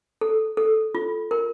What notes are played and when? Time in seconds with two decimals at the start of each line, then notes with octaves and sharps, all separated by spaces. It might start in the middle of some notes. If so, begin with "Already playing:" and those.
0.21 A4
0.57 A4
0.95 F4
1.31 A#4